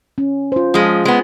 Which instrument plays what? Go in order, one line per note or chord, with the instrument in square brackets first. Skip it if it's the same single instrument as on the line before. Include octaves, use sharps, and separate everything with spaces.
[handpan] C#4
F4 C5
[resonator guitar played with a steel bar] F3 G#3 [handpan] F4
[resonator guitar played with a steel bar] G#3 B3